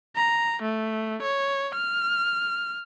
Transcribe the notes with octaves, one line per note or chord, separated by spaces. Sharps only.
A#5
A3
C#5
F6